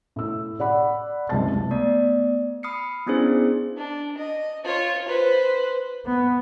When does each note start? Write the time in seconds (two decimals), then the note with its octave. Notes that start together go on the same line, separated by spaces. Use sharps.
0.16 A2 E6
0.60 D5 F#5 B5
1.29 F#1 C#2 C3 C4 A5 A6
1.71 A3 B3 D5
2.63 B5 D#6 F6 C7 C#7
3.07 B3 C#4 D4 E4 G#4 C5
3.77 D4
4.18 D#5
4.64 F4 C#5
5.08 B4 C5
6.06 B3